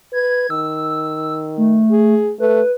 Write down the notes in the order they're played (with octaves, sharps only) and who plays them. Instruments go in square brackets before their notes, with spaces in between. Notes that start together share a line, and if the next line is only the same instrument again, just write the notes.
[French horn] B4 [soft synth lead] G#6
[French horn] D#3 [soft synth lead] E6
[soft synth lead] A3
[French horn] G#4
[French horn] A3 [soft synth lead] B4